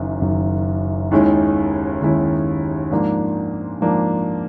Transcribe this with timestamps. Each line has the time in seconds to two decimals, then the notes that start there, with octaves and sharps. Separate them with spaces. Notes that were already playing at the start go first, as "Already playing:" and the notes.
Already playing: F#1 F#2 D#3
0.21 F#1 F#2 D#3
1.11 D#2 D#3 G#3 C#4 E4
2.01 D#2 D#3 G#3 C#4 E4
2.91 G#2 F3 A#3 D4
3.81 G#2 F3 A#3 D4